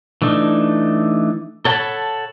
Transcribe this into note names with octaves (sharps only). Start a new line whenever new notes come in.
E3 A3 D4 D#4
A4 C#5 F#5 A5 B5